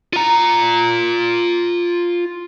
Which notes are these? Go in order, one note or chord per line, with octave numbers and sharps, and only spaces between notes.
F4 A#5